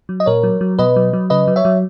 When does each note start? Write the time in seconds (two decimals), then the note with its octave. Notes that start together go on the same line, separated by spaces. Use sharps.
0.09 F#3
0.20 D#5
0.26 A#2 A#4 C#5
0.43 F#3
0.61 F#3
0.79 B2 B4 D#5
0.96 F#3
1.13 F#3
1.30 C#3 B4 D#5
1.48 F#3
1.56 C#5 E5
1.65 F#3